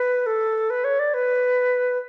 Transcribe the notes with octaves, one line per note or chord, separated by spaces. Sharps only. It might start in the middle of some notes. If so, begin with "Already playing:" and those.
Already playing: B4
A4
B4
C#5
D5
B4